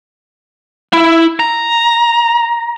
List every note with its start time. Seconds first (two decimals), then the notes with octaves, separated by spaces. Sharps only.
0.93 E4
1.40 A#5